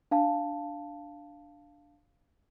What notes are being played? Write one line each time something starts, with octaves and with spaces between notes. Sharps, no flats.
D4 F5 A5